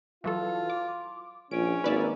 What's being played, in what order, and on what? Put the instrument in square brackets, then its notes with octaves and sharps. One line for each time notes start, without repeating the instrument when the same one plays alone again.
[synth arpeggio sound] E3 F#3 A4 [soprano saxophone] F4
[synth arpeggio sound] D6
[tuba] A#1 [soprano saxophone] C#4 [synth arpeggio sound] D7
[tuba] G#1 [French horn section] G#2 A#3 D#4 [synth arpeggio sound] B4 D5 E5